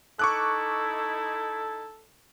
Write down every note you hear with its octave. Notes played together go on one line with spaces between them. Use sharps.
D#4 E4 A4 C#6 D6 F#6